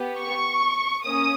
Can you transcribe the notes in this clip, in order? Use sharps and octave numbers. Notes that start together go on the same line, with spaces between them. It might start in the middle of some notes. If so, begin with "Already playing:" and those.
Already playing: B3 G4
C#6
A#3 C#4 D#6